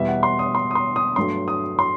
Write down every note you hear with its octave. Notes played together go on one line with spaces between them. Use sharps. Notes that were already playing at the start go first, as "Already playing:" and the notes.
Already playing: E2 B2 G3 E5
F#5
C6
D#6
C6
D#6
C6
D#6
G2 F#3 A3 C6
D#6
C6